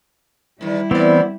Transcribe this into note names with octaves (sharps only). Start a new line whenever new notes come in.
E2 D#3 G3 E4
A2 E3 B3 C4 D5